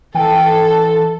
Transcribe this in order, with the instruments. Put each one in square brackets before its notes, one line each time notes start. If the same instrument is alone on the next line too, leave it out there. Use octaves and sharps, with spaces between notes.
[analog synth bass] E3 [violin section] A4 [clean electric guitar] G5